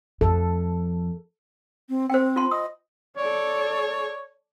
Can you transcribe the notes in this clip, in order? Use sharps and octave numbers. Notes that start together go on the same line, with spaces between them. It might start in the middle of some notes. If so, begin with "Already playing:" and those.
F2 F3 A4
C4
C4 C5 G5
F4 A5 C6
D#5 D#6
A4 C#5 D5